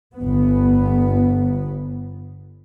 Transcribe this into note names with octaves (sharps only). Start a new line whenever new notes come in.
G1 B3